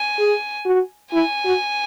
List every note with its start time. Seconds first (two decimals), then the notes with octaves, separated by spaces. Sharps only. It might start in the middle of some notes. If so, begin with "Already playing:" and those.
Already playing: G#5
0.18 G#4
0.65 F#4
1.13 E4 G#5
1.45 F#4